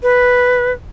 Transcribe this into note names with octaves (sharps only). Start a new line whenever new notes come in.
B4